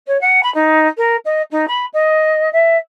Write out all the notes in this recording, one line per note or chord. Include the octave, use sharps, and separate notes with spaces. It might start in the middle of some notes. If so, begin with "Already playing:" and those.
C#5
F#5
B5
D#4
A#4
D#5
D#4
B5
D#5
E5